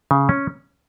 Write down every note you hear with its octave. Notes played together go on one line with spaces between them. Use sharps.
C#3
C#4